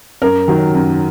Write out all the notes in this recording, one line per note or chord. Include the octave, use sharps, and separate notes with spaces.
F#2 A#4
D#3 F#3
F#2